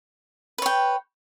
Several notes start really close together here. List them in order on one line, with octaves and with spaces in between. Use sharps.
B4 C#5 G5